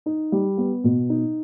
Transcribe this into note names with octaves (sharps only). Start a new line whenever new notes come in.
D#4
G3
B3
B2
D#4